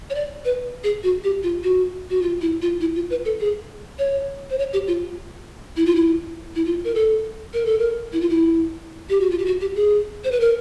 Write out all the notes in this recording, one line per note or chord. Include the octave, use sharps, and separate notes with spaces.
C#5
D5
B4
G#4
F#4
G4
F4
F#4
F#4
F4
E4
F4
E4
F4
B4
A4
G#4
C#5
C5
C#5
G4
F4
E4
F4
E4
E4
F4
A#4
A4
A#4
A4
A#4
E4
F4
E4
G4
F#4
F4
G4
F#4
G4
G#4
C5
B4
A#4